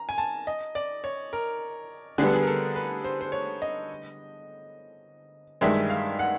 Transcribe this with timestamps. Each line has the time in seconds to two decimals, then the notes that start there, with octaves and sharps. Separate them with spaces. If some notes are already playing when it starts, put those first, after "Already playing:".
Already playing: A#5
0.09 G#5
0.18 A5
0.47 D#5
0.75 D5
1.04 C#5
1.33 A#4
2.18 D3 G#4
2.21 G3 B3 A4
2.33 G#4
2.42 A#4
2.47 A4
2.76 B4
3.04 C5
3.21 C5
3.32 C#5
3.62 D#5
5.61 G2 D#3 G#3 E5
5.90 F5
6.19 F#5